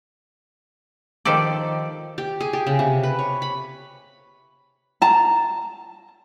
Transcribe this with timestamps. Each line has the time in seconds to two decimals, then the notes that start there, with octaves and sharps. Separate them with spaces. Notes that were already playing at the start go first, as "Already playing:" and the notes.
1.25 D#3 F3 G4 A4 D5
2.18 G4
2.40 G#4
2.53 G4
2.67 C#3
2.79 C3
3.03 B4
3.19 C#5
3.42 B5
5.02 A5 A#5